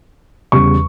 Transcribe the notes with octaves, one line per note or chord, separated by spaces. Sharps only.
E2 C#3 G3 C#6